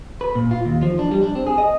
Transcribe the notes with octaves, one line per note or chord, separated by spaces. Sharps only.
B4
A#2
F4
D#2
F3
D4
G3
D4
C4
G#4
D#5